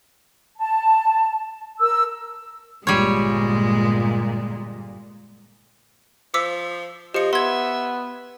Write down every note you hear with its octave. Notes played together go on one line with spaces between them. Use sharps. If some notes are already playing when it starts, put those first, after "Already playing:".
A5
A#4 E6
G1 A#2 G3 G#3 C#5
F3 D6 E6 B6
F3 G4 D#5 C#7
B3 E5 C6 G#6